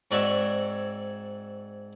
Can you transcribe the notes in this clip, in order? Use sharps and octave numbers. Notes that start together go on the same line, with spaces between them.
G#2 C4 F#4 C#5 D5 E5